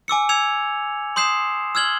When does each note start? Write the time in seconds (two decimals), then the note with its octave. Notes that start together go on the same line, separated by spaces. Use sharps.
0.08 G#5 D6 E6 C#7
0.29 E6 G#6 C#7 F7
1.16 C6 D#6 G6 C7 E7
1.75 E6 F6 G#6 F#7 G7